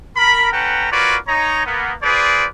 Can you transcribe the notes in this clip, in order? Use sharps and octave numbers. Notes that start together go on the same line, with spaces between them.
A#4 B5
C#4 A4 B4 F#5 G5 A#5
F4 F#4 A#4 B4 C#5 D5
D#4 C#5 A#5
A#3 B3
F4 G#4 B4 C5 D5